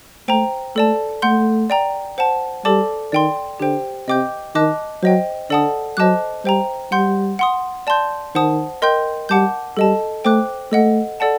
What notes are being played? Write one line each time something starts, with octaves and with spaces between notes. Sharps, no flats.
A3 C5 G5 A#5
A3 A4 D5 A5
A3 F#5 C6 G6
D5 G5 A#5
C5 F#5 A5
G3 A4 D5 A5 D6
D#3 D5 G5 C6
D3 G4 C5 G5
C3 D#5 G5 D6 G6
D#3 D#5 A5 D6 F#6
F#3 C5 D#5 G5
D3 A4 D5 F#5 A5 D#6
F#3 C5 D#5 A5 D6 F#6
G3 C5 G5 A#5
G3 F#5 C6 G6
F#5 C6 D#6
D5 A5 C6 G6
D#3 C5 F#5 A5 D#6
A#4 D#5 G5 C6 G6
G3 F#5 A5 D6 G6
G3 A4 D#5 A5
A3 C5 G5 D6 F#6
A3 A4 D#5 F#5
A4 D5 F#5 A5